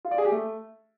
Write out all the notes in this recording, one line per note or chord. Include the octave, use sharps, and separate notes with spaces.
F4
D5
G#4
G4
A3